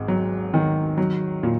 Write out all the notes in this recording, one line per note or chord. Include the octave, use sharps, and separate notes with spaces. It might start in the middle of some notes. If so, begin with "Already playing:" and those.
Already playing: G#1 G#2
F#3
D#3
F#3
A#2